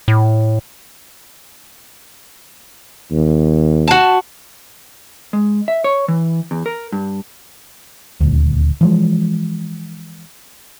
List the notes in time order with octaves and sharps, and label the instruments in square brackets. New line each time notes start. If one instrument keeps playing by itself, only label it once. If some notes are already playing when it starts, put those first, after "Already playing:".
[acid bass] A2
[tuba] D#2
[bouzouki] F#4 A5
[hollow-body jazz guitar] G#3
E5
C#5
E3
E2
A#4
G2
[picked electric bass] D#1 D2
E3 F3 G#3